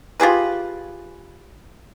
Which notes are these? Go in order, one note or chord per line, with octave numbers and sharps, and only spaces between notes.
F4 G4 G#4 B4